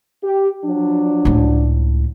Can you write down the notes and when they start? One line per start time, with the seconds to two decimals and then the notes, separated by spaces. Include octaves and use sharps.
0.23 G4
0.64 F3 F#3 D4
1.25 C#2 A2